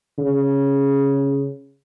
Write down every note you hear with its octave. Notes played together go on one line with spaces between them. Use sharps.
C#3